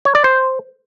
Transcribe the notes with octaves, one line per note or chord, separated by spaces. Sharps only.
C#5
D5
C5